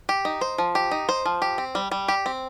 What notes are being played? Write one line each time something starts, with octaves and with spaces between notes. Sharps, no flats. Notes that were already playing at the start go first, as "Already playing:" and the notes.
G4
D#4
C5
F3
G4
D#4
C5
F3
G4
C4
G3
G3
G4
C4